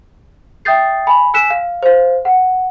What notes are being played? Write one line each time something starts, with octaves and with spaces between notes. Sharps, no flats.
E5 G5 D#6 G6 A6 C7
G#5 B5
G#5 E6 F#6 B6 D7 E7
F5
C5 F5
F#5